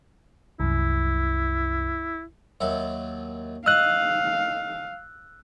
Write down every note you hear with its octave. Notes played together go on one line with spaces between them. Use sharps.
C2 F#2 E4
D#2 F#3 E5
D#5 F5 E6 F#6